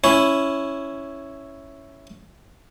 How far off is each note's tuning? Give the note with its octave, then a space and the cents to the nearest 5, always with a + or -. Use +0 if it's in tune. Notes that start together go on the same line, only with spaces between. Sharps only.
C#4 +0 E4 +0